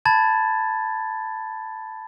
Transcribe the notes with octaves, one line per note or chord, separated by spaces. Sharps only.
A5 B5 G#6 A6